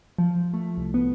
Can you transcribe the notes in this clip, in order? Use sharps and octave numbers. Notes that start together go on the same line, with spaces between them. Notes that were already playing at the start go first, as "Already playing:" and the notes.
F3
A3
C2
B3